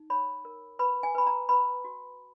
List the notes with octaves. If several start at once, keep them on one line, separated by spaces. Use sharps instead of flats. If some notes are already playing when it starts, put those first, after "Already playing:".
Already playing: D#4
C#5 B5
A#4
B4 B5
G#5
B4 B5
A#5
B4 B5
F#4